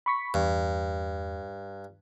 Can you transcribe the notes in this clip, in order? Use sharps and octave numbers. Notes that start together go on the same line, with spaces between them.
B5 C#6 B6
E2 G2